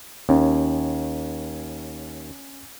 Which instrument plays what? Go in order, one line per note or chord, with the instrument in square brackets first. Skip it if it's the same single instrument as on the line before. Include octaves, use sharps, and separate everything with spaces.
[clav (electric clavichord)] D#2 [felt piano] C#4